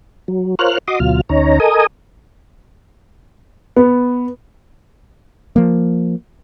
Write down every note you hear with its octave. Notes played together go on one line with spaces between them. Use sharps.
F#3
F4 A#4 C5 C#5 F6 F#6
F#4 D#5 C6 D6 D#6
D2 B2 F#3 F4 F6
D2 C#4 D#4 C#5 A#5
A4 A#4 D#5 G#5 D#6
B3
F3 A#3